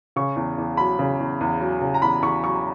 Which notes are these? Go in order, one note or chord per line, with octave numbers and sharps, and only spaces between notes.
C#3 C#6
E2
E2
F#3 B5
C#3
E2
E2
F#3
C#3
A#5
E2 B5
E2 C#6
F#3 C#6